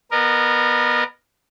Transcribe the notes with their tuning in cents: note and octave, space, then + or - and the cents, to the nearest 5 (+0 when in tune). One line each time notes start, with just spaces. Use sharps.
B3 -10 A#4 +0 D#5 -40